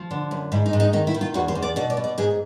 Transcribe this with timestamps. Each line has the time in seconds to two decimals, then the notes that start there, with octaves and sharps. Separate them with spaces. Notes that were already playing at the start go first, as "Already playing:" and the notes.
Already playing: F3
0.11 D3
0.31 F#2
0.52 G#2 E4
0.66 D#4
0.73 G#2
0.80 D#4
0.93 D#3 D#4
1.07 E4
1.14 D#3
1.21 F4
1.34 E2 F#4
1.48 C5
1.55 E2
1.62 D5
1.76 B2 D5
1.90 D5
1.97 B2
2.04 D5
2.18 G#2 G#4